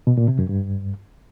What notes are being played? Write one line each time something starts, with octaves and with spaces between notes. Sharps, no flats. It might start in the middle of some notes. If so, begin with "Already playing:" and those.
B2
A#2
C3
F#2
G2